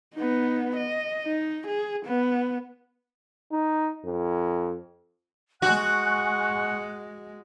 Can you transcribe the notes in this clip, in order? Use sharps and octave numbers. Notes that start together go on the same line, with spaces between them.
B3 D#4
D#5
D#4
G#4
B3
D#4
F2
G#3 F#4 F#5 G#5 C#6 F#6